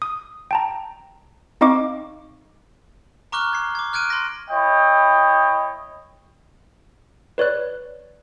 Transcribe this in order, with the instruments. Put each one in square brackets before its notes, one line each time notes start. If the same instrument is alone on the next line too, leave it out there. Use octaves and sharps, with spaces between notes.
[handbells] D#6
G5 A5 A#5
C4 D#4 D#5 F5 C#6 D6
[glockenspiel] A#5 C#6 D6 F6 F#6 G7
G#6 C7
D6 G#6
F6 F#6 G#6 D7 D#7
C6 A#6
[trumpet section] E4 C#5 D#5 G5
[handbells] B4 C#5 D5 F#6